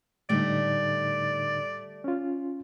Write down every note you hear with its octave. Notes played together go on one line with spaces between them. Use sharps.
A2 D3 G3 A3 D#4 D5
C#4 F4